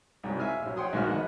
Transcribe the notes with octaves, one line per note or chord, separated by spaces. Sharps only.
C2 G#2 F#3
E5 F5 G#5 E6 F6
A#1 F#3
C#5 F#5 G5 C6 D#6
A#1 G#2 D#3 F#4 F6
B3 B4 D#5 F#5